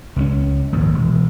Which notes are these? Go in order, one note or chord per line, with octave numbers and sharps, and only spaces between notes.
C#2 G#3 C#4
A#1 D#2 G#2
E1